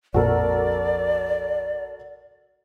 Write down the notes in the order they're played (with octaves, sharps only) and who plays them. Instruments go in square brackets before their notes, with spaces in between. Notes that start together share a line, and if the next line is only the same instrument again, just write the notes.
[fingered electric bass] A#1 F2 A#2 [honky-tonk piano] F#4 A4 A#4 [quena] D5